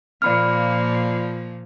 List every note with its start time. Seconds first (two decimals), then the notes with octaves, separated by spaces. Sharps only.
0.22 A#2 F3 A#3 D5 B5 F6